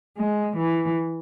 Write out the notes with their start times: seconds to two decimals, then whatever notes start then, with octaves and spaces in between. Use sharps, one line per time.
0.17 G#3
0.57 E3